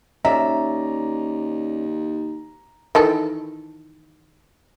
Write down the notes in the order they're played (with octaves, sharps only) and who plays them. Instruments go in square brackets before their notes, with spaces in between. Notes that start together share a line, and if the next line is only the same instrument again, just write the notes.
[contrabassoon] D#2 [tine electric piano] C#4 D5 [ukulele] E5 [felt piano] A#5
[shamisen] D#3 E3 A4